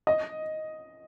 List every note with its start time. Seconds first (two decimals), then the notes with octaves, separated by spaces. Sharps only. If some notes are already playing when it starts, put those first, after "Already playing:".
0.07 D#5